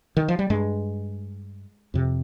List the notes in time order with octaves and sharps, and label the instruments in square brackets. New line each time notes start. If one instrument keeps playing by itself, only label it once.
[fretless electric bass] D#3
F3
G3
G2 G#3
F2 C3